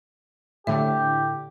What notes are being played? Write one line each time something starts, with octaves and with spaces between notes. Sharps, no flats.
A2 D3 G4 E5